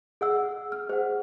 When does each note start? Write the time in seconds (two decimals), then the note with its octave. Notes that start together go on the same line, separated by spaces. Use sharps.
0.21 G#4 F#5 E6
0.72 F6
0.89 G#4 C5 F#5